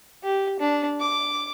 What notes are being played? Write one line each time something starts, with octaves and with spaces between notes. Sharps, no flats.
G4
D4
D6